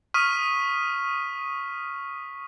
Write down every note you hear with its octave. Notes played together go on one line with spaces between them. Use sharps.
C#6 D#6 F6 B6 D#7